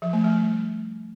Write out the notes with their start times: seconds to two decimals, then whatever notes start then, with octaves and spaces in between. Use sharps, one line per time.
0.02 F3
0.13 A3
0.24 G3